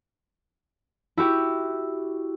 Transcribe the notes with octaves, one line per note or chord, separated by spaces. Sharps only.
E4 F#4 G4